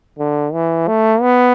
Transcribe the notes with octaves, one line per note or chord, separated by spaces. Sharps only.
D3
E3
A3
B3